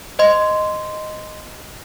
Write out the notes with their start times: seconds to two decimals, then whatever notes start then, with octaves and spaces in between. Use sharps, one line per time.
0.19 C5 D#5 C6